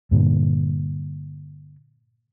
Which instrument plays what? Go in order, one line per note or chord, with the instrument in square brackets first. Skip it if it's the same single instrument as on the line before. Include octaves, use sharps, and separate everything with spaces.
[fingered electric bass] G2 A#2 D3